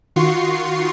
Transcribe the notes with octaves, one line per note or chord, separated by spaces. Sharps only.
D#3 F4 F#4 C6 C#6 C7